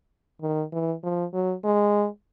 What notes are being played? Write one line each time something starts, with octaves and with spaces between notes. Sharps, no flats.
D#3
E3
F3
F#3
G#3